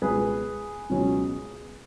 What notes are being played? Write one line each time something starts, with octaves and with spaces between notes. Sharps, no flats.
C#2 B2 G#3 B3 G#4 B4
C#2 B2 F#3 C#4